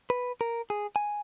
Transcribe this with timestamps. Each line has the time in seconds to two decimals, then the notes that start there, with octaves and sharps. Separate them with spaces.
0.10 B4
0.41 A#4
0.70 G#4
0.96 G#5